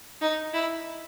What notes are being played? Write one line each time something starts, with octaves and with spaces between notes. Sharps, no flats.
D#4
E4